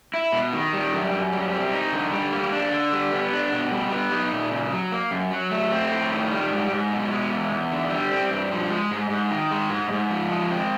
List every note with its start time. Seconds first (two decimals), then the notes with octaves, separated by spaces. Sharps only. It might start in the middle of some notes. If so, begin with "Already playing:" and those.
0.14 E4
0.32 B2
0.53 D#3
0.73 G3
0.93 F#2
1.13 F#2
1.33 G3
1.52 C4
1.72 D#4
1.92 D3
2.12 G3
2.32 A#3
2.52 D4
2.72 D3
2.92 G3
3.12 B3
3.33 D4
3.52 B2
3.71 G3
3.92 B3
4.12 D#4
4.32 A#2
4.51 C#3
4.72 F#3
4.92 A#3
5.11 F#2
5.31 F#3
5.51 A3
5.72 C4
5.91 A2
6.11 D#3
6.31 G3
6.51 G#2
6.71 G#2
6.92 B2
7.11 G#3
7.30 E2
7.51 E2
7.72 D3
7.90 G3
8.11 C4
8.31 G2
8.51 F3
8.71 G#3
8.91 G#2
9.10 G#2
9.31 D#3
9.51 G#3
9.70 G#2
9.91 G#2
10.10 F3
10.31 G#3
10.51 C4